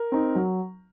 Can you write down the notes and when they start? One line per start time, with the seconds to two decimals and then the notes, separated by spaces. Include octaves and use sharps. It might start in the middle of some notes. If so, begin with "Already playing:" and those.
Already playing: A#4
0.12 C4 D#4
0.35 F#3